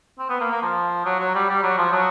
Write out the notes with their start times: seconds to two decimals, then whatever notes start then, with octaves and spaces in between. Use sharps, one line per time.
0.19 C4
0.30 B3
0.41 A#3
0.52 A#3
0.62 F3
1.05 F#3
1.20 F#3
1.35 G3
1.49 G3
1.63 F#3
1.78 F3
1.93 F#3